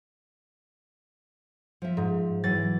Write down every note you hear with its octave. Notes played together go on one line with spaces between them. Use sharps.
F3 E5
G#2
E3 F#3 A6